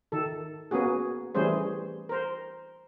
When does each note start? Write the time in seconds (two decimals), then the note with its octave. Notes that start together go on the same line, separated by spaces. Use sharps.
0.12 D#3 A4
0.71 A#3 B3 C#4 F#4 G#4
1.35 E3 G3 A3 C#4 G#4 C5
2.09 A#4 C5